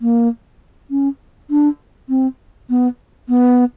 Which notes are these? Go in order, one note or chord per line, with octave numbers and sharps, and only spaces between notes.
A#3
C#4
D4
C4
B3
B3